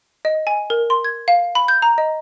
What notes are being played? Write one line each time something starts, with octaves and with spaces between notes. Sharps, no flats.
D#5
G#5
A#4
C6
G#6
F5
B5
G6
A#5
D#5